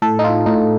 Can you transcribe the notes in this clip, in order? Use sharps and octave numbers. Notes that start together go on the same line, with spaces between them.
A2 A4
D#4
F4
A2 D#4